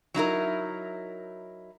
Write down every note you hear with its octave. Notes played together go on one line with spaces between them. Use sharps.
F#3 D#4 E4 A#4